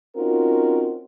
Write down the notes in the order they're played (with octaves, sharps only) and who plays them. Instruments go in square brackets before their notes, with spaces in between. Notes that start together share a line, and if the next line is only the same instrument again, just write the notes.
[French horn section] C4 C#4 D#4 F4 F#4 A#4